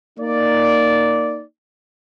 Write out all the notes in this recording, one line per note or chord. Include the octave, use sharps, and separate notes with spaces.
A#3 D#4 D5